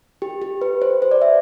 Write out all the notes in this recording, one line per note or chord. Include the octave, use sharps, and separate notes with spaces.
G4
G4
B4
C5
C5
D5
E5